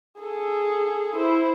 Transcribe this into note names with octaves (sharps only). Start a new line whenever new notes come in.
G#4 A4
E4 C5